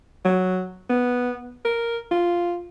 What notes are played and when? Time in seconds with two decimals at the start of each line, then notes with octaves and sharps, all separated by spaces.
0.25 F#3
0.89 B3
1.65 A#4
2.11 F4